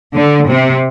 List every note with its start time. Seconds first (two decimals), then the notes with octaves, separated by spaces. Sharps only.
0.14 D3
0.48 C3